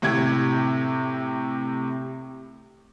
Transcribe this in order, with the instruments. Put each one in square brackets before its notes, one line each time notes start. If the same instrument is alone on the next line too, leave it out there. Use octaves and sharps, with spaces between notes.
[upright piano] A2 C3 E4 G4 G#6